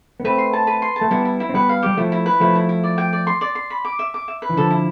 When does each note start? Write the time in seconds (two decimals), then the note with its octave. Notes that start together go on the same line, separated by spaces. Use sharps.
0.20 B3
0.24 A3 C4 B4
0.38 C6
0.53 A5
0.67 B4
0.82 C6
0.96 A5
1.01 A3
1.11 G3 B3 E4
1.25 E4
1.40 E4
1.49 C4
1.54 G3 B3 B4
1.69 F5
1.83 G3 G4
1.97 F3 A3 E4
2.12 E4
2.26 B4
2.40 F3 A3 E4
2.55 E4
2.69 E4
2.83 D5
2.98 G5
3.13 D5
3.27 C6
3.41 D5
3.55 C6
3.70 B5
3.85 D6
3.99 E5
4.14 D6
4.28 E5
4.42 B4
4.49 E3
4.57 D3 F3 A4
4.71 E4